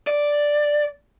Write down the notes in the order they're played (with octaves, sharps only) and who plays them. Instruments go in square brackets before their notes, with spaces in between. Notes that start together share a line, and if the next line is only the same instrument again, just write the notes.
[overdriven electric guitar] D5